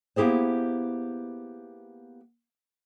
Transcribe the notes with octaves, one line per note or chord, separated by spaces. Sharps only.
A#3 B3 E4 G4 G#4 C5